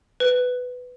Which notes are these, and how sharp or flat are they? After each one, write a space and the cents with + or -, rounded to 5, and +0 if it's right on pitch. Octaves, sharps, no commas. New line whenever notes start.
B4 +10